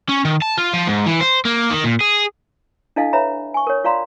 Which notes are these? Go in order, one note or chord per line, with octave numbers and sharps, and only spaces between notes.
C#4
D#3
A5
F4
F3
G#2
E3
C5
A#3
D#3
A#2
G#4
D4 E4 A4 D#5 F5 G#5
B4 C#5 E5 A#5 B5
G#5 C#6
A#4 C#5
F4 D5 F5 A#5 C6